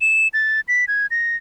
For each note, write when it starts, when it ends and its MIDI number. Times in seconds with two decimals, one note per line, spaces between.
0.01 0.28 100
0.34 0.60 93
0.68 0.85 95
0.88 1.07 92
1.11 1.36 94